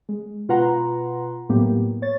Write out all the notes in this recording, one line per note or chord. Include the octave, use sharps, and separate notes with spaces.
G#3
B2 F4 B4 F#5 A#5 C6
A2 F#3 A#3 B3 G4
C#5 A6